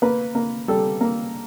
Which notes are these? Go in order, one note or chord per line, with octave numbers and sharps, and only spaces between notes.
A#3 B4
A#3
G3 A4
A#3